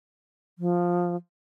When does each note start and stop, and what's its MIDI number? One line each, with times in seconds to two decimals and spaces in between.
0.59 1.16 53